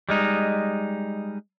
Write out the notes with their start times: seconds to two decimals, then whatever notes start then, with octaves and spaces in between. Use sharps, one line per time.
0.09 G3 G#3 D#4